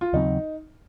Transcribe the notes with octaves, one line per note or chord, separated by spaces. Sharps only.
F4
D#2 C#3 F#3 C4 D#4